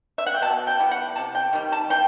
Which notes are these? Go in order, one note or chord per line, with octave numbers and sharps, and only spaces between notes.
E5
F#5
G5
B2 A5
G5
G3 B3 E4
F#5
C3 A5
G5
D#3 G3
A5
E3 G5